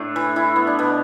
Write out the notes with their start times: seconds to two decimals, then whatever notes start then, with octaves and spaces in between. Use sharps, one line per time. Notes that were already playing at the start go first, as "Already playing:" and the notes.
Already playing: A2 A3 D4
0.16 E3 E4
0.36 E3 E4
0.56 B3
0.67 D4
0.79 B2 B3